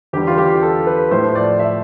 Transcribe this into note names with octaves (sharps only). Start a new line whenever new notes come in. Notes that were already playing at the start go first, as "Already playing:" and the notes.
E2 D3 G3 G4
F4
G4
A4
B4
A2 F3 A3 C5
D5
E5